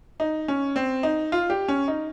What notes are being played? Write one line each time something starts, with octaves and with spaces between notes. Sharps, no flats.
D#4
C#4
C4
D#4
F4
G4
C#4
D#4